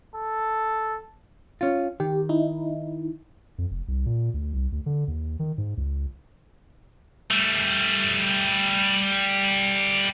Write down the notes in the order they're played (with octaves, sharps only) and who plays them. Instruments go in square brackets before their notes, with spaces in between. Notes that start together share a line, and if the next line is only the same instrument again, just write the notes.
[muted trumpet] A4
[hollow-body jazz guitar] C#4 F4
[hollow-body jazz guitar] D#3 [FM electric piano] G4
[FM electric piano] D#4 E4
[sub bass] F2
F1
C2
A#2
D2
C2
D2
D3
D#2
D#3
G#2
C#2
[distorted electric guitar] G3 A3